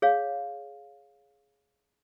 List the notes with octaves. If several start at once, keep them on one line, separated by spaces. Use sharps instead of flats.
G#4 C#5 F5